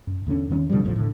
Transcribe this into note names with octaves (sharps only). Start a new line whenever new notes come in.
F#2
E2 D3 A#3 C#4
E2 D#3 A#3 C#4
B2 D3 F3 G3
A1 E2 A2 F3
A2 D3